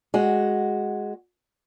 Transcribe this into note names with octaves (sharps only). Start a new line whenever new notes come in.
G#3 F#4